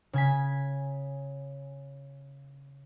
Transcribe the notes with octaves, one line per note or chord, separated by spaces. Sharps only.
C#3 G#5 B6